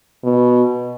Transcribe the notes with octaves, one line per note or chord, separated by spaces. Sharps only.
B2